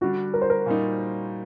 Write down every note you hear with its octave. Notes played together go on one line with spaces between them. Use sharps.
D3 G3 D4 F#4
A#4
C5
A#4
A#2 G3 A#3 D#4